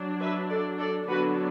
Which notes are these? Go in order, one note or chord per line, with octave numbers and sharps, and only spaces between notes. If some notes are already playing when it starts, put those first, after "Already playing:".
Already playing: F#3 D4
B4 E5
A4 D5
A4 D5
D3 F#3 B3 D4 F#4 B4